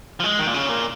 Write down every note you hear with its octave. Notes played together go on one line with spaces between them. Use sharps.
F3
G#3
D#3
A#2
C#3
A#2